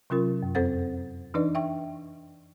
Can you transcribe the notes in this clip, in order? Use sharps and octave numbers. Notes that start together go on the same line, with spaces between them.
C3 F#3 C#4 F4 A#4
F#2
F2 C4 A4 C5 F#5 A6
E3 D4 D#4 B4 D5
E5 G5 C#6